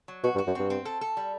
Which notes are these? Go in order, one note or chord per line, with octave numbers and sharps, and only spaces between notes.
F#3
B2 F#4
G2
F#4
F#2
G2 C4
C4
A4
A4
G3